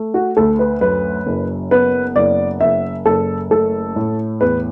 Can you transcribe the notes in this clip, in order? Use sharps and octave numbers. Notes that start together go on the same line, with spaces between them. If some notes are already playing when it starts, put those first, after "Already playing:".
Already playing: A3
F#4
D2 A4
B4
F#2 B4
F#1
B3 B4
F#1 D5
F#1 E5
F#1 A4
A3 A4
A2
E2 B4